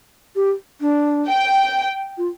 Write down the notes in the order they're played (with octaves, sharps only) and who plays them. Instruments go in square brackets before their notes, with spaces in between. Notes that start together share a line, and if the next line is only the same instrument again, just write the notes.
[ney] G4
D4
[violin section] G5
[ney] F4